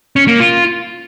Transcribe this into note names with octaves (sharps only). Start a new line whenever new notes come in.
C#4
A#3
F4